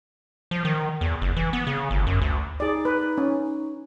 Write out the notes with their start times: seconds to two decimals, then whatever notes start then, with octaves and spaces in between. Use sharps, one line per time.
0.51 F3
0.65 D#3
1.01 E2
1.22 F#1
1.37 E3
1.53 B3
1.67 C#3
1.91 G1
2.07 F#2
2.22 D2
2.60 D#4 G#4 D5
2.85 B4
3.18 C#4